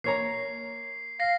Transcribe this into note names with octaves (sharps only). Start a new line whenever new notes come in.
A#3 C#5 A#5 C7
F5 A#6 C7